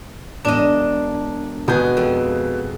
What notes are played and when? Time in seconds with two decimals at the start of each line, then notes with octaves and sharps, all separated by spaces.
0.45 E1 D4 D#5 E7
1.68 B2 G#3 B3 G#4 G6
1.97 F2